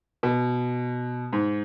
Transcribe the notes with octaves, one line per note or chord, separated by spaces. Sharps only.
B2
G#2